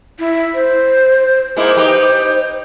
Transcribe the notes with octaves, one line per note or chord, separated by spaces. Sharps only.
E4
C5
G#3 A#3 E4 C5
D#4 G4 B4